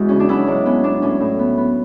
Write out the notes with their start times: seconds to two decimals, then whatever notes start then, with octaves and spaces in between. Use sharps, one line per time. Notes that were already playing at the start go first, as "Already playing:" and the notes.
Already playing: E2 G#3 E4 F#4 G#4
0.09 C#3 C#4
0.20 D4
0.29 F#3 C#4 E4
0.47 G#2 D4
0.65 B3 C#4
0.84 B3 D4
1.02 A2 C#4
1.20 A2
1.39 B3
1.58 B3